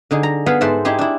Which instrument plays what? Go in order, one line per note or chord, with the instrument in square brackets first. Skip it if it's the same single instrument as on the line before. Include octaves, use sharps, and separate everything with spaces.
[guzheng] D3 D#4 G#4
A#5
B3 G#4 F5 F#5
G#2 A4 C5 E5 F#5
D#4 E4 G4 G#4
D4 E4